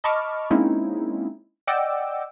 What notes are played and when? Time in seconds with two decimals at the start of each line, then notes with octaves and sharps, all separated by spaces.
0.04 D#5 A5 B5 C#6 D6 F6
0.51 G#3 A#3 C4 C#4 D#4 E4
1.67 D5 D#5 F#5 G5 D6 E6